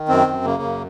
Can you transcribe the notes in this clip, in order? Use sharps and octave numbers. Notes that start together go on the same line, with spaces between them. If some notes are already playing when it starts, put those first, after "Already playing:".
Already playing: D#3
F#2 C4
F#2
C#3 A#3
F#2